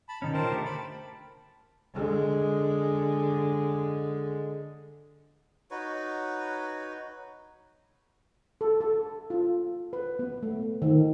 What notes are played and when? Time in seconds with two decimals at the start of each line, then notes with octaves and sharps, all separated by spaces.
0.09 A5 B5
0.22 B2 D#3 C#4 D#4
0.34 F4 A#4 C5 G5 A5
0.52 D3 A3 G4
0.65 G5 A5 B5
1.94 D3 G#3
5.71 D#4 F#4 B4 C#5
8.61 A4
8.81 A4
9.30 F4
9.93 B4
10.19 B3
10.43 A3
10.82 D#3